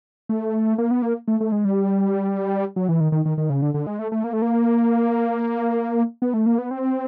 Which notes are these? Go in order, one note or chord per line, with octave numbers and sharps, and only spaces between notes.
A3
A#3
B3
A#3
A3
A3
G#3
G3
F#3
E3
D#3
D#3
D#3
D#3
C#3
D3
D3
G#3
A3
A3
A#3
A3
A#3
B3
A3
A#3
B3
C4